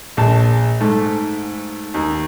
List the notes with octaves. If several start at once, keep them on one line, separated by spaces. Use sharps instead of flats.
A#1 A5
G#2 A3
D#2